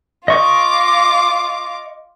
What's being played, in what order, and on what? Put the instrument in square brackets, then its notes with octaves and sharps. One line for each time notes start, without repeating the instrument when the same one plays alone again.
[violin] F4 D6 [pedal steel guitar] D#5 C#6